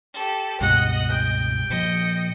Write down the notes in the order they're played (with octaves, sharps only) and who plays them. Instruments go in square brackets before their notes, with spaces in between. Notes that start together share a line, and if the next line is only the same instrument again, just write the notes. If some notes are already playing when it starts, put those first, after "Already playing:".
[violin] G4 A4
[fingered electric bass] C#2 G2 B2 [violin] D#5 [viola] F#5
[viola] G5
[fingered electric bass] A#2 F3 [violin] D#5 C#7